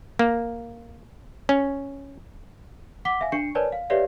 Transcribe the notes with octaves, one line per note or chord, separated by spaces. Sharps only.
A#3
C#4
F#5 D6 B6 G7
E5 F5 G#5
D4 C#6 C7 C#7
A#4 B4 C#5 D5 G#5 A5
F5
G4 B4 C#5 D5 E5 F5